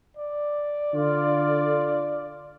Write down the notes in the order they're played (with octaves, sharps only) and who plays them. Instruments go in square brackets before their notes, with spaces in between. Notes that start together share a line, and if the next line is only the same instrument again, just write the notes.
[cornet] D5
[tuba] D3 [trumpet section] F4